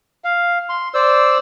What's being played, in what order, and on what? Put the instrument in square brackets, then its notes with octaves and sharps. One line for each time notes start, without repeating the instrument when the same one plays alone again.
[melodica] F5
C6
C5 D5 E6